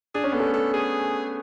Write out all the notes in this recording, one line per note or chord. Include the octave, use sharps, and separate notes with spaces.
D4 G#4
C#4
B3 A4
A3 C#4
A4
G#4